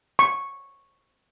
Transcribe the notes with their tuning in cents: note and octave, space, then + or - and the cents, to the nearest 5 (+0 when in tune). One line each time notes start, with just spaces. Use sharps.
C#6 -5